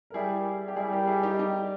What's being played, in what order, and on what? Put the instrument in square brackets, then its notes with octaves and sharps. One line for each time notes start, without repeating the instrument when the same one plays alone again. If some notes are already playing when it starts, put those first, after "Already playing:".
[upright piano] A#4
[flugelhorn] G3 [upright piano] E4 G#4
[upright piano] G4
[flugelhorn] G3 [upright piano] E4 G#4
[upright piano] G4 A#4
E4 G#4
D#4 G4
D#4 G4